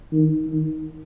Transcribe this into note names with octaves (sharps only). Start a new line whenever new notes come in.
D#3
D#3